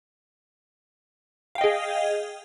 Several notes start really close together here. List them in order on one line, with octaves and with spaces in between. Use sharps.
F5 G5 D#5 G#4